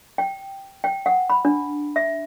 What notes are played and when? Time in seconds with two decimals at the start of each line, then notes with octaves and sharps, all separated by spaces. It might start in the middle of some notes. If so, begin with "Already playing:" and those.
0.18 G5
0.84 G5
1.06 F#5
1.30 B5
1.45 D4
1.96 E5